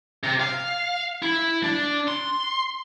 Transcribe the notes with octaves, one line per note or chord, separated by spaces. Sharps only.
C3
F5
E4
D4
C6